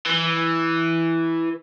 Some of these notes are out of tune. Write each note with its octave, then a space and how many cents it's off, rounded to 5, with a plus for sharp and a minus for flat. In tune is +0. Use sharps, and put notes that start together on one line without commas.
E3 +0